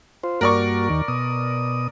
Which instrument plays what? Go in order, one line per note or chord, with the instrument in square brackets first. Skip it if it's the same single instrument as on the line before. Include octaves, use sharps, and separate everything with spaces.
[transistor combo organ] F4 C5
[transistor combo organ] G2 A#3 F#4 [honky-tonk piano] A#4 D5 C#6
[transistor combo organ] D#2 D#3
B2 D#6